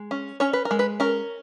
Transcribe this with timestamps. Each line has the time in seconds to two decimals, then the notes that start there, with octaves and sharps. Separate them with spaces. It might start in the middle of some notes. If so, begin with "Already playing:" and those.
Already playing: G#3
0.11 C#4
0.40 C#4 C#5
0.53 B4
0.65 A#4
0.71 G#3
0.79 B4
1.00 C#4 A#4